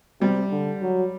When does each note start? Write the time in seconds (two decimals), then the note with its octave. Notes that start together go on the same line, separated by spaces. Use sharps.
0.21 C3 G3
0.51 D3
0.81 F#3